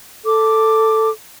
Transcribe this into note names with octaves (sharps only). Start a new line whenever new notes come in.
A4 D6